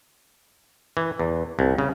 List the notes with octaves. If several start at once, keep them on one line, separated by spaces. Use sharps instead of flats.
E3
E2
C2
C#3